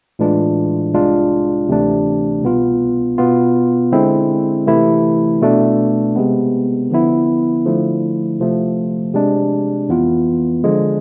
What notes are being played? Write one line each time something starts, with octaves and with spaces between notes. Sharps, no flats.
A2 E3 G#3 D4 F4
C2 C3 G#3 D4 F4
D2 C3 E3 A3 D4
C2 B2 B3 F4
B2 B3 F4
D3 G#3 C4 E4
C3 E3 A3 E4
B2 A3 D4
C3 G#3 B3
D3 F3 B3 E4
D3 F3 A3 E4
C3 F3 A3
C3 G#3 D4
F2 E3 B3 F4
D3 F3 G#3